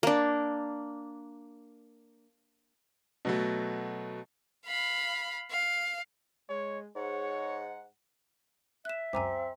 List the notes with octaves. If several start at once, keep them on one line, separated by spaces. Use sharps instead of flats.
A#3 D4
B2 F#3 A3
F5 B5
F5
G#3 C#5
G#2 C#5 F#5
E5 F#6 E7
C#2 F#2 C4 G#5 A#5 D6